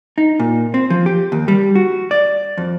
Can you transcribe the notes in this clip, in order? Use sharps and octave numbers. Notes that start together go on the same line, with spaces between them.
D#4
A#2
C4
F3
G4
D#2
G3
F#4
D5
F2